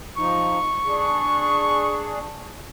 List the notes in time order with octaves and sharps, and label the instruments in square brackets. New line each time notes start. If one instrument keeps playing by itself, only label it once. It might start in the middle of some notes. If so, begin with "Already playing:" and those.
[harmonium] F3 D#4 [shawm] C#6
[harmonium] D4 G#4